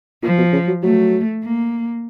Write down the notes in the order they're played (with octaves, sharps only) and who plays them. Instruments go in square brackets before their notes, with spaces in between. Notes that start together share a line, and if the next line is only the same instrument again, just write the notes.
[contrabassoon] A#2 [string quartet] F3
[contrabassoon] B2
C#3
F#3
[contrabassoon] F#3 [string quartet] A3
[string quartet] A#3